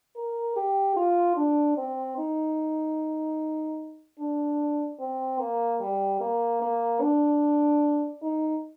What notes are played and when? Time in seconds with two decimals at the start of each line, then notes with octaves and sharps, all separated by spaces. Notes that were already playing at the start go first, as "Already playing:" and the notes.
0.16 A#4
0.56 G4
0.96 F4
1.37 D4
1.77 C4
2.18 D#4
4.19 D4
5.00 C4
5.39 A#3
5.80 G3
6.21 A#3
6.62 A#3
7.01 D4
8.22 D#4